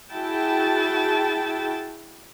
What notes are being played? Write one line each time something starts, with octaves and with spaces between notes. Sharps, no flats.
E4 F#4 G#4 G5 A5